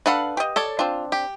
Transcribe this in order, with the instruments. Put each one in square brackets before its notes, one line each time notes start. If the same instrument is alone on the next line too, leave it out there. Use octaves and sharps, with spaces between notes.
[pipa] D4 A4 B5 [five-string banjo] B4 F5 F#5
[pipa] G4 D#5
[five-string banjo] A4 C#5 D5
[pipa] C4 D4 [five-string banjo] F4
[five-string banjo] G4